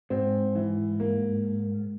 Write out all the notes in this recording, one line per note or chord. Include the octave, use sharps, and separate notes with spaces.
G#2 C4
E3
A#3